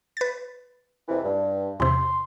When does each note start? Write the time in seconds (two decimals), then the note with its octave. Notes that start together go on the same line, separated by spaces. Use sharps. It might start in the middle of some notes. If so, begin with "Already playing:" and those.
0.17 B4 A6
1.08 F2 C3 E3
1.24 G2
1.80 E2 C3 C6